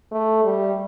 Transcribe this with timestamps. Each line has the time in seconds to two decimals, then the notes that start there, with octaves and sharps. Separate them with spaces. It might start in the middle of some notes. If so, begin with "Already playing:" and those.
0.11 A3
0.44 G3